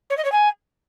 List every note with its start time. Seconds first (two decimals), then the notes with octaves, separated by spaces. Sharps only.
0.10 C#5
0.17 D#5
0.24 C#5
0.31 G#5